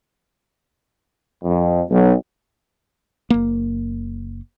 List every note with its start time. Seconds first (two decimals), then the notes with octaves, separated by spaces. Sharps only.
1.44 F2
1.91 B1 F#3
3.30 F#1 A#3